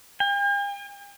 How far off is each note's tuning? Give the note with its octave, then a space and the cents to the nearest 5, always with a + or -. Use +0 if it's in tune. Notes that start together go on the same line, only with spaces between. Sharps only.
G5 +45